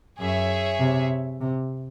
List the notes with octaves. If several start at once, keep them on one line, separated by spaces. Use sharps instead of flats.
F#2 G#4 C#5 E5
C3
C3